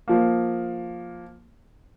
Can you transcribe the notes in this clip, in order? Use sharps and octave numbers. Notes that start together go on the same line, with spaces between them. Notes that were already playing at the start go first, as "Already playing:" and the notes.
F3 A#3